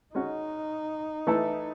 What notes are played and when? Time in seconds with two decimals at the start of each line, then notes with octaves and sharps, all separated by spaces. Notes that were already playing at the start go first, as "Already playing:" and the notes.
0.14 G#3 C#4 D#4 F#4
1.27 E3 A3 E4 A4